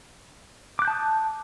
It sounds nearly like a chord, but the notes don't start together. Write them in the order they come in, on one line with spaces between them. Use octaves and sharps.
D6 F#6 G6 A5 D#6